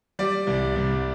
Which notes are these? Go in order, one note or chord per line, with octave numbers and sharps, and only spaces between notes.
G3 D5
C2
C2